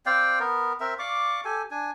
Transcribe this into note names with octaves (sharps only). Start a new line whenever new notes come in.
C4 D5 F5 G5
B3 A#4
C4 A#4 E5
D5 F5 C#6 D6
G4 A4 G#5
D4 G#5